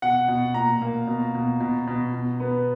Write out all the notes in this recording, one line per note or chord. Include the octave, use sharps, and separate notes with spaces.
B2 F#5
B2
A#2 A#5
A#3
B2
B2
B2
B2
B2
B3